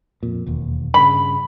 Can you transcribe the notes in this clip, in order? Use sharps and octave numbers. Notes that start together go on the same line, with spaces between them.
F2 A#2
E1 D#2
G2 C#3 B5